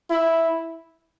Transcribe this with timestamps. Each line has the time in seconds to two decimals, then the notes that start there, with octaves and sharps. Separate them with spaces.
0.10 E4